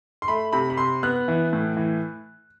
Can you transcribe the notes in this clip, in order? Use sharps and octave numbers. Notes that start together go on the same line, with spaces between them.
C6
A3 B5
C3 B5
B5
C3 C6
B3 F#6
E3
A2
E3